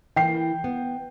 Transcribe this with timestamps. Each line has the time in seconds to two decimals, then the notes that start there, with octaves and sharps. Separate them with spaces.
0.16 E3 A#3 G5 C7
0.64 B3